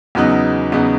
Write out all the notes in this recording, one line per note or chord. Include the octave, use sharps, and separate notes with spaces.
E2 C#3 F#3 B3 D#4
E2 C#3 F#3 B3 D#4